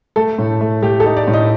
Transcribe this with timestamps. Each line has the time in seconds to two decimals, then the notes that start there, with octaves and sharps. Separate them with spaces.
0.16 A3 A4
0.38 A2
0.61 A3
0.83 A3 G4
1.00 A4
1.06 D#4
1.17 D5
1.28 A2
1.34 D#5